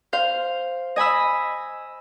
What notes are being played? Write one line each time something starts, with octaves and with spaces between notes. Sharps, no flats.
C5 F5
D#5 G#5 B5 E6